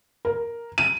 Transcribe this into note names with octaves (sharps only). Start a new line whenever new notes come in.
A#4
D#7